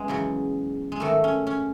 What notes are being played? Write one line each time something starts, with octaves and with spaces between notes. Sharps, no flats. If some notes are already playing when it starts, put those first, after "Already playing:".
Already playing: G#3 B3 C#4
E2 C#3 F#3
G#3
G#2 D#3 F#3 A3
C#4
C#4